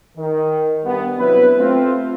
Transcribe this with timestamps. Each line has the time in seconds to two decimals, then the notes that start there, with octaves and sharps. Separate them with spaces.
0.17 D#3
0.84 G2 B3
1.18 C3 F#3 B3 D4 E4 B4
1.58 A3 C4 F4